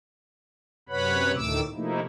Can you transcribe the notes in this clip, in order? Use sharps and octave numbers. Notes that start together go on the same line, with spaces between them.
F#2 C3 B4 C#5 F#5 B5
D2 A2 D#3 A3 D6 E6
C3 F3 A3 A#3 D#4 E4